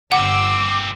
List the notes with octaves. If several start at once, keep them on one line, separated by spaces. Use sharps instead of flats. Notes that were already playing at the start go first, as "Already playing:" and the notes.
G1 A#2 C4 F#5 D6 E6